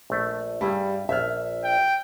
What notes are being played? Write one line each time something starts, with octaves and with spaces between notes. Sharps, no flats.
A#1 A3
G2 G3 E4 G#4
A#1 E5 F6
G5